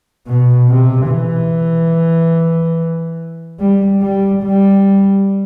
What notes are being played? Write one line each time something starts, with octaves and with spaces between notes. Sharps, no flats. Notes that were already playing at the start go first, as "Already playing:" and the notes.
B2
C3
E3
G3
G3
G3